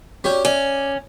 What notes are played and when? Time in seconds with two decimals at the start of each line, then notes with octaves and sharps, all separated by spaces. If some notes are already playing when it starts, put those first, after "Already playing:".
0.24 C#4 F#4 G4 C#5 D5
0.45 C#4 C#5 D5 E5